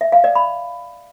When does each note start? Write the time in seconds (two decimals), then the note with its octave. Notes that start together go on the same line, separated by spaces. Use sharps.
0.01 E5
0.12 F5
0.24 D5
0.35 B5